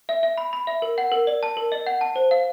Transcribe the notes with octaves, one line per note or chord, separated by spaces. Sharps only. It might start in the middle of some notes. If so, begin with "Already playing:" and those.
E5
E5
B5
B5
E5
A#4
F#5
A#4
D5
A5
A#4
D#5
F#5
A5
C5
F5